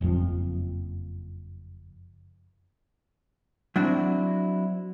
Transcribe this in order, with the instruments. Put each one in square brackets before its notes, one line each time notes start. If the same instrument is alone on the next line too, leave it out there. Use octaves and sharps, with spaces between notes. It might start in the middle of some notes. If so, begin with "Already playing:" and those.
[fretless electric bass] F#1 F2 F3
[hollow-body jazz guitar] F#3 C4 D4 E4 F#4